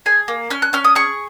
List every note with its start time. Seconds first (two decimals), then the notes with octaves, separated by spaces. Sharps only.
0.06 G#4 G#5
0.28 A#3
0.50 C#4 F6
0.62 F#6
0.73 C#4 F6
0.85 D#6
0.95 G#4 C#6